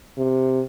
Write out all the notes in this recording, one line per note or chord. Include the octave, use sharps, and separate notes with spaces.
C3